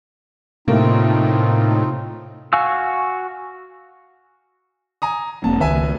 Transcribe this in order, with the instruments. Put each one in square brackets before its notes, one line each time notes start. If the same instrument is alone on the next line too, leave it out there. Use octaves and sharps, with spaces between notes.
[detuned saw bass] A2 [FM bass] C3 [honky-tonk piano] A3 A#3 [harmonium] C4 D#4 F4
[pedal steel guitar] F#4 F5 G#5 C#6 E6
[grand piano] G#5 A#5 D#6
[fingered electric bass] E1 A#3 C4 [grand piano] A5
[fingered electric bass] C#2 D#3 [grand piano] B4 E5 G#5